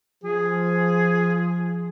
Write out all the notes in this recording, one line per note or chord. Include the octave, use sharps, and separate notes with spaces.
F3 G#4